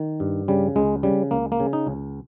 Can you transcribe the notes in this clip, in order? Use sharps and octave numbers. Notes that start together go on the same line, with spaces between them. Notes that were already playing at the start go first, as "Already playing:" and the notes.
Already playing: D#3
G2
C#3 G3
C#2 G#3
C#3 G3
C#2 A#3
A#3
C#3
D#4
C#2